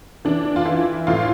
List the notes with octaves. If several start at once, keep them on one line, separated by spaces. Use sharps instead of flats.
E3 D4
F4
E3 E4
A2 F4